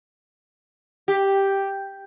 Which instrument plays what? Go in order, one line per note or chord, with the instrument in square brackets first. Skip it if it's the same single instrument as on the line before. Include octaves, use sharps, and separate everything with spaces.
[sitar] G4